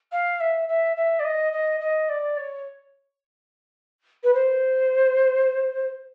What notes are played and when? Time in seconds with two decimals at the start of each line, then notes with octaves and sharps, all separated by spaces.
0.12 F5
0.40 E5
0.68 E5
0.96 E5
1.19 D5
1.24 D#5
1.52 D#5
1.80 D#5
2.09 D5
2.37 C#5
4.23 B4
4.34 C5